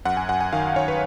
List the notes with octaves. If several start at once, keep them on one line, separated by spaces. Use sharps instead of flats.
F#2 F#5
G#5
F#2 F#5
G#5
D#3 F5
D#3 C#5
B4